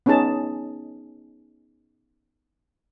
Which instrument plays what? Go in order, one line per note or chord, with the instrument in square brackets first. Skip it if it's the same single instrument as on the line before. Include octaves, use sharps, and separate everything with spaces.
[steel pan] B3 C#4 D#4 G#4 A5